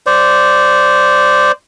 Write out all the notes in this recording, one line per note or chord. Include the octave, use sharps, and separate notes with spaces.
C5 D5